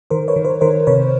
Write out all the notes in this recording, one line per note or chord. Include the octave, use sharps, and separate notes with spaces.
D#3 A#4 C5
B4 C#5
D#3
A#4 C5
D#3 A#4 C5
C3 B4 C#5